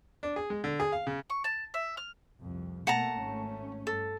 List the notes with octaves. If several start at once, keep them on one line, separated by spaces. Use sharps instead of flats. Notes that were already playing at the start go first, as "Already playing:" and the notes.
D4
G#4
G#3
D3
G#4
F5
C#3
C#6
A5
E5
F6
C2 F2
B2 A3 A#3 F#5 A5 A#5
G#1 A3 C#4
G2 A4